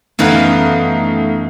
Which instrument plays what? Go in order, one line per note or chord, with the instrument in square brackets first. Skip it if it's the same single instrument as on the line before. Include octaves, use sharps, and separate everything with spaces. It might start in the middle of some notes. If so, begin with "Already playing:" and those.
[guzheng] F#2 E3 B3 [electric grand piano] A3 D#4 F5